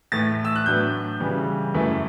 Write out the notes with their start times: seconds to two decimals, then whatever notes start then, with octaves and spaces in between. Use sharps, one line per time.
0.12 A2 E3 A3 E4 A6
0.45 E6
0.56 F#6
0.66 A2 F#3 B3 D4 G6
1.20 C#3 E3 G3
1.73 F#2 E3 A3 E4